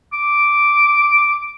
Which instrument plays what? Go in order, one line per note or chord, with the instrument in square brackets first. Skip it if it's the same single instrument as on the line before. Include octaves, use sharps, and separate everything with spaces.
[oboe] D6